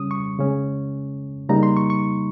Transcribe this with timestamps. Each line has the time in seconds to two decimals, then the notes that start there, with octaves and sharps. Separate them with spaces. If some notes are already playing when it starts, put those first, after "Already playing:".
Already playing: C#3 G3 C#4 D#6
0.11 C#6
0.38 C#3 G#3 C#4
1.49 C#3 G3 A#3 D#4 A#5
1.63 C6
1.77 C#6
1.90 C#6